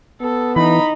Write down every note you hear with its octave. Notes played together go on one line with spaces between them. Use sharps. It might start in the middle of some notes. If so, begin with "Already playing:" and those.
B3 A4
E3 D#4 B5